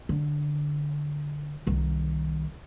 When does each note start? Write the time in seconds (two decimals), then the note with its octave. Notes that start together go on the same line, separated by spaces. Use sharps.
0.09 D3
1.67 C2 D#3